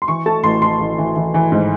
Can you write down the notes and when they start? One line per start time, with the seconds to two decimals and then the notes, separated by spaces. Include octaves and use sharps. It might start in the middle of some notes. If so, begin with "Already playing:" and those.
0.02 C6
0.08 E3 C#6
0.26 A3 A5
0.44 A1 C6
0.62 A1 C6
0.80 A1
0.98 E3
1.16 E3
1.34 E3
1.52 G#2